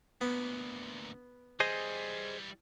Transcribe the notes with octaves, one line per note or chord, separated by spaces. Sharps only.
D2 A#2 B3
E3 G3 G#4 C5 D#5